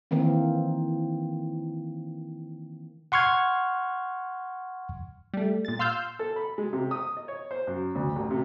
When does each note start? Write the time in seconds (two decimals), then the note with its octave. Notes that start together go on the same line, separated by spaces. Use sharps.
0.11 D#3 E3 A#3 C4
3.12 F#5 C6 C#6 F6 G#6
5.34 G3 A3
5.65 A#2 A6
5.79 F5 C6 E6 F6 G6
6.19 A4
6.36 B5
6.58 G#3
6.73 C3
6.91 D#6
7.17 D#5
7.28 C#5
7.51 C5
7.67 F#2
7.95 D2
8.16 A1
8.31 C3